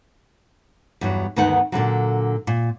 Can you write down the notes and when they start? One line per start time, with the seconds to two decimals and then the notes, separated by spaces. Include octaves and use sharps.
1.01 E2 G2 F#3
1.36 D2 G2 D#3 B3 D#4 F#5
1.72 A#2 D3 E3 F#3
2.47 A#2